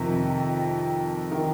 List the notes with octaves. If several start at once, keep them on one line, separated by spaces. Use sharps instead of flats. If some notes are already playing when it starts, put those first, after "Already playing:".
Already playing: F2 C3 D#3
D#3